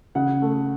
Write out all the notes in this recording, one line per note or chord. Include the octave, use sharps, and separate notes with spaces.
C#3 F#5
A3